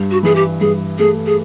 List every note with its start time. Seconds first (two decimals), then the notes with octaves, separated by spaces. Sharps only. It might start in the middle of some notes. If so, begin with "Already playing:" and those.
Already playing: G2
0.11 F#4
0.23 E3 G#4
0.36 G4
0.60 G2 G#4
0.98 A3 G#4
1.26 G#4